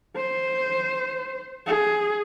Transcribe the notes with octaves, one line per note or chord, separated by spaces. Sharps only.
C5
G#4